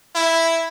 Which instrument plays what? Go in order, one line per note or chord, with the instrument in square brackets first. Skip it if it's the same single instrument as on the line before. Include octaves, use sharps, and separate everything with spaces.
[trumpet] E4